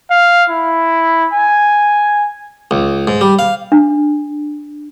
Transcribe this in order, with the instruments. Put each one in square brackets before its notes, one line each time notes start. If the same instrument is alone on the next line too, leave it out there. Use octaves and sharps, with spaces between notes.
[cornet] F5
E4
G#5
[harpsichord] C#2
G#2
G3
F5
[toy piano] D4